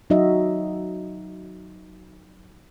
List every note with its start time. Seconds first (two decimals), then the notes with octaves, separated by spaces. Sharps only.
0.10 F#3 D#4 F#4 D#5 E5